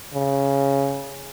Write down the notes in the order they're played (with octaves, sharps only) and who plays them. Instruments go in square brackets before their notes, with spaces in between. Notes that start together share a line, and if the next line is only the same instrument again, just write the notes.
[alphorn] C#3